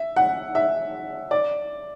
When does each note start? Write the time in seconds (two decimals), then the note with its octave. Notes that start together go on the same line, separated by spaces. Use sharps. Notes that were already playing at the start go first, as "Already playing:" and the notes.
Already playing: E5
0.16 F#5
0.55 E5
1.31 D5